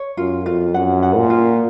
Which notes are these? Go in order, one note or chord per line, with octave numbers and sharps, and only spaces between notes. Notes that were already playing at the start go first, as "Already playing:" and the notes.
Already playing: C#5
F#2 F4
F2 F4
F#2 F#5
F#5
A#2
F4